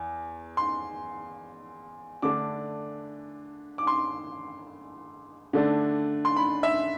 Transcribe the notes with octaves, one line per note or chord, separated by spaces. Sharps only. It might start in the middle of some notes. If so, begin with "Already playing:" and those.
Already playing: E2
C6
D3 A3 D4 D6
D6
C6
D3 A3 D4
C6
B5
E5